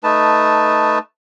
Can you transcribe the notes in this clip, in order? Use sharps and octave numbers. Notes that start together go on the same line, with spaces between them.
A3 D#4 B4 A5